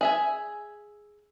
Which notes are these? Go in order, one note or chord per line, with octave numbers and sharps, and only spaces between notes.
G#4 E5 G#5